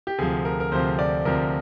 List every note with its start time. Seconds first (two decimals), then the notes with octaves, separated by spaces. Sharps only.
0.07 G4
0.19 D2 C3 F3 G#4
0.45 A#4
0.60 A#4
0.72 D2 C3 F3 C5
0.99 D5
1.25 D2 C3 F3 A#4